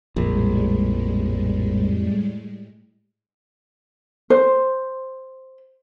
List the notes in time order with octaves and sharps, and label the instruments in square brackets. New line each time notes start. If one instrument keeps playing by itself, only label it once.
[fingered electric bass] A#1 [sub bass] F2 [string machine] A2 G3 G#3
[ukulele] C5